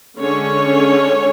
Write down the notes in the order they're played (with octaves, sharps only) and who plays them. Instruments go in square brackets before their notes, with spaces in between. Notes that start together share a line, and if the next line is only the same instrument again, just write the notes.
[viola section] D3 G#3 C#4 C#5